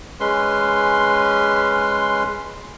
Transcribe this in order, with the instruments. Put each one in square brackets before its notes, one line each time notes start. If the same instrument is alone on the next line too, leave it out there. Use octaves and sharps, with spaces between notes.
[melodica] G#3 C#4 B4 C6